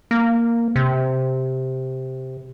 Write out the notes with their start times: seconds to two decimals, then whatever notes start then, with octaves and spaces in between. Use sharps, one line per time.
0.11 A#3
0.76 C3